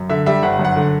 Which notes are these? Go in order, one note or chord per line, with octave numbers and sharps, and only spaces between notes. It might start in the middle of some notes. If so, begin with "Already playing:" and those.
Already playing: F#2
D3 E5
G3 E5
G1 F#5
F#2
F#5
D3